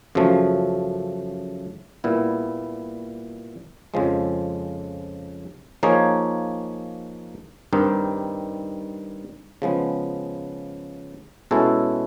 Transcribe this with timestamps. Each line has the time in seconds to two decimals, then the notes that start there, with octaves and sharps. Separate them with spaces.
0.15 F#2 C#3 F3 A3
2.04 A#2 G3 B3 E4
3.94 F2 C#3 F3 G#3
5.83 F3 A#3 D#4 G#4 C#5
7.73 G2 D#3 G3 C4 D#4
9.62 C#3 F3 G#3 B3
11.51 B2 G#3 C#4 E4 A4